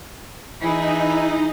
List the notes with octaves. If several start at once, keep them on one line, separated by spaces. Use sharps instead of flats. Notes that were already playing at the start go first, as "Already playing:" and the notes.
E3 D#4 E4 G#4